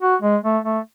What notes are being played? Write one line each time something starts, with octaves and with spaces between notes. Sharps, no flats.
F#4
G#3
A3
A3